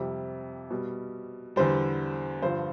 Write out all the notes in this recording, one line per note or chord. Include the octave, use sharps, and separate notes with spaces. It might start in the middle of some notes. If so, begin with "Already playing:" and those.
Already playing: F2 C3 G3
B2 G3
E2 D3 G3 C5
G2 D3 F3 C5